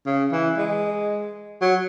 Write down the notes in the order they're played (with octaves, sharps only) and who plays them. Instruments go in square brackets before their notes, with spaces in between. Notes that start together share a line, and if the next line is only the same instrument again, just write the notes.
[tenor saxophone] C#3
E3
G#3
F#3